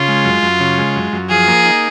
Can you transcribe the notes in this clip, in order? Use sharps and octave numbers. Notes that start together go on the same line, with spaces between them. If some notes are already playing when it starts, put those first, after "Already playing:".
Already playing: C#3 F4
G#3
F#2
F#2
C#3
G#3
F#2
F#2
F3 G#4
A#3
D#4